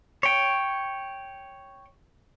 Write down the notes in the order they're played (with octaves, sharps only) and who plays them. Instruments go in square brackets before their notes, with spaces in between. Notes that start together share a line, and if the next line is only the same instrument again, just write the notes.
[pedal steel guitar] C#5 G5